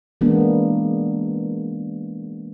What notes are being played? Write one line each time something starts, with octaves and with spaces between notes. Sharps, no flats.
E3 G#3 A#3 B3 D4